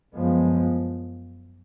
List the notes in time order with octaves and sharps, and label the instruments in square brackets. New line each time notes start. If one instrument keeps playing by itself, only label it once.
[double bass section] F#2 F3 G#3 B3